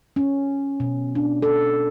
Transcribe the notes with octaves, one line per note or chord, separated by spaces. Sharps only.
C#4
B2
D4
A4